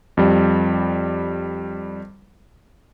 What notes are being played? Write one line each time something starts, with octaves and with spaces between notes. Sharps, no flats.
F2 G3